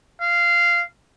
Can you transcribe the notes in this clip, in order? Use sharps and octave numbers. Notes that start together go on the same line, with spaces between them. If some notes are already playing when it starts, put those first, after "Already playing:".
F5